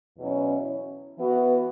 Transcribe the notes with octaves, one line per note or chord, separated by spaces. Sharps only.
E2 B2 F#3 C#4 E4
E3 B3 F#4